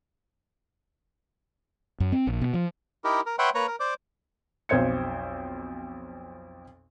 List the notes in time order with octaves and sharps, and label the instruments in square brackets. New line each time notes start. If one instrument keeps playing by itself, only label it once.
[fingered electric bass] F#2
C4
A#1
B2
F3
[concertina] D#4 E4 G4 A#4
A#4
B4 C#5 E5 F#5 G5 C6
A#3 B4 C#5 A#5
A#4
C5 D5 D6
[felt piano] B1 F2 C5 G#6 C#7